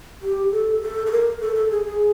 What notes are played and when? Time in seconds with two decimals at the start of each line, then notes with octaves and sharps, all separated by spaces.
0.22 G4
0.52 A4
0.82 A4
1.06 A4
1.11 A#4
1.41 A4
1.56 A4
1.71 G#4
1.85 G#4